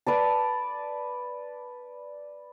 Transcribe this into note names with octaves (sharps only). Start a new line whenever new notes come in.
B4 D5 A5